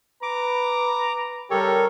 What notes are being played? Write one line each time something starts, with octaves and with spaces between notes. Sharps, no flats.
B4 A#5 D6
C#3 G3 G4 A4 A#4 C#5